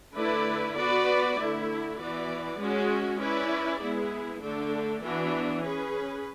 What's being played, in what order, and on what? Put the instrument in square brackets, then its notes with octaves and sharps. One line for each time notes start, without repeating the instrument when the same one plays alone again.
[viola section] D3 A3 E4 B4 D5
B3 F#4 B4 D5
D3 A3 E4
E3 B3 F#4 B4 D5
G#3 C#4 F#4
C#4 E4 B4 D5
G#3 B3 E4 G#4
D3 A3 D4 A4
E3 B3 D4 F#4
C#4 G#4 B4